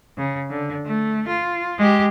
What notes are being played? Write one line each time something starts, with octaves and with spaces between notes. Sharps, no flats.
C#3
D3
A3
F4
G#3 G4